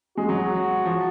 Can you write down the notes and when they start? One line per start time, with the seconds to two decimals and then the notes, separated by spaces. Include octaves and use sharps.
0.17 G#3 F#4
0.29 F#3
0.85 F3